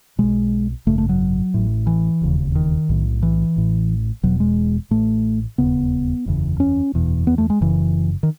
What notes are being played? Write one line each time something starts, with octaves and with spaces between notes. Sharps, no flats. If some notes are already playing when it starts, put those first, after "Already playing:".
B1 B2 G#3
G#1 F#2 C#3 A3
A3
F#3
A1 A2
E3
E1 D#2 C#3
D#3
B1 A2
E3
A1 A2
E1 E2 B2 F#3
G#3
A1 A2 A3
E1 D#2 C#3 B3
F#1 E2 C#3
C#4
F#1 E2 B2
B3
A3
G#3
F#1 F#2 C#3 E3
D#3